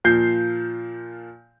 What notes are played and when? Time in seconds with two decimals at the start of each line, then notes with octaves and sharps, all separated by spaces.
0.04 A#2 F3 G6 C7